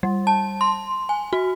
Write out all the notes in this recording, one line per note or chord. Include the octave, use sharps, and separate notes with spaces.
G3
A5
C6
G#5
F#4